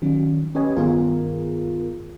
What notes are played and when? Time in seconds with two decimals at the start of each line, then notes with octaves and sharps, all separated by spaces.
0.02 D#3 F#3 C#4
0.55 C#4 G4 B4 C#5 D#5 G#5
0.76 G2 D#3 B3 F4 G#4 A#4